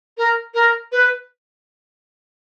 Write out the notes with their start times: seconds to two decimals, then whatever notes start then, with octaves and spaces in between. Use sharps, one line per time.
0.18 A#4
0.54 A#4
0.92 B4